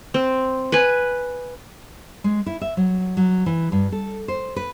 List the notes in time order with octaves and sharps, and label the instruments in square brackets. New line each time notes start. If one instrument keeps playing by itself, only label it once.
[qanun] C4
B4 G#5
[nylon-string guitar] G#3
E4
E5
F#3
F#3
E3
G2
A4
C5
B4